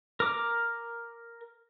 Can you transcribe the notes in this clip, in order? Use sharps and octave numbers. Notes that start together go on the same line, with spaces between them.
A#4 D6